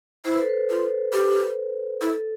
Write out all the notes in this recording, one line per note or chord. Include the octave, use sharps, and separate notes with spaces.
E4 C5
B4
A4
B4
F4
G4
E4 A4